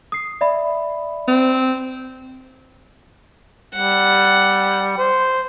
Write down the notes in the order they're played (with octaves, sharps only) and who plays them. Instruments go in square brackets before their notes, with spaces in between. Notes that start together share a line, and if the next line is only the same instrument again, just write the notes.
[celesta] D#6 C7
D5 E5 B5
[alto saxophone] C4
[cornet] G3 [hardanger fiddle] F#5
[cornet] C5